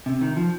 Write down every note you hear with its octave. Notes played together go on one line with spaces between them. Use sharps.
C3
D#3
F3